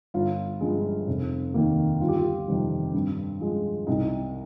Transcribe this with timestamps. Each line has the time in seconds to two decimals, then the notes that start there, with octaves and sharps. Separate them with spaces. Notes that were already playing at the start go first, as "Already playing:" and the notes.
0.14 G1 F4
0.61 G2 F3 G#3
1.07 F1
1.54 D#2 D#3 A#3
2.00 G1 F4
2.08 G4
2.16 F4
2.48 F2 C3 D#3 G3
2.94 G2
3.41 F3 G#3
3.87 C2 D#4